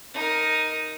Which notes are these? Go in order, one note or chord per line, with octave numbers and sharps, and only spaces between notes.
D#4 A#4